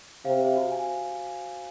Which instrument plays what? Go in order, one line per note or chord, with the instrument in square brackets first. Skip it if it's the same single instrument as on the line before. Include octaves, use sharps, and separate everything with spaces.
[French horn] C3 [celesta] F5
[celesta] C5
F#4
G#5